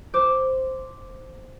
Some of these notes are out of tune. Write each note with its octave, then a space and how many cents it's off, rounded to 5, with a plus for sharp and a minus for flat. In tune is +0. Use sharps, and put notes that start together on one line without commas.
C5 +0 D6 +0